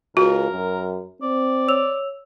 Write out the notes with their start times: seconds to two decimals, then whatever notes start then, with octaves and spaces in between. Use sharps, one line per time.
0.17 C#2 F#4 A#4
0.51 F#2
1.22 C4 D5
1.68 C#5 E6 F7